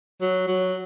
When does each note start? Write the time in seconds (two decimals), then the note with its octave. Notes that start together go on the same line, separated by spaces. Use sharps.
0.22 F#3
0.48 F#3